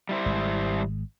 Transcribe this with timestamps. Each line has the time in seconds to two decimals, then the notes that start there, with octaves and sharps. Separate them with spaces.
0.09 G3 E4 C5
0.26 G#1 G#3